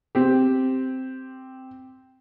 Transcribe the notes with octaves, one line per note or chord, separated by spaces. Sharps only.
C4 G4